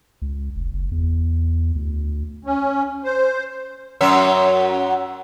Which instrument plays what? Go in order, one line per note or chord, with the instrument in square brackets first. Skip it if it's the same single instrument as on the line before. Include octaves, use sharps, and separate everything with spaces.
[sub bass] C#2
F1
F#1
E2
D2
[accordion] C#4
C5
[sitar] F#2 F#3 E5